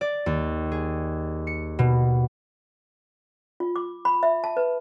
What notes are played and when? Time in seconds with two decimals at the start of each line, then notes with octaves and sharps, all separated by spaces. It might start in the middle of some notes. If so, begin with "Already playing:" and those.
0.01 D5
0.26 D#2
0.72 G#4
1.47 C#7
1.79 B2
3.60 F4
3.76 D6
4.05 B5
4.23 E5
4.44 A5
4.57 B4